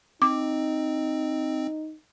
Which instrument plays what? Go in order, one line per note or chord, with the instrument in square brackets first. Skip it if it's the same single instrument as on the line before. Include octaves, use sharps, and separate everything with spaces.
[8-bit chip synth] C4 [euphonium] D#4 [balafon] D6